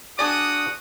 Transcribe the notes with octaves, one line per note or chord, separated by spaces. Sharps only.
D4 F#4 G#4 D5 D#6